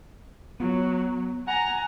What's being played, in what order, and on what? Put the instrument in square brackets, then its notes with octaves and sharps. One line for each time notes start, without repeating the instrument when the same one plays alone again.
[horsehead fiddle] F#3 [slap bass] B3
[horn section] F#5 A#5 [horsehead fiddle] G#5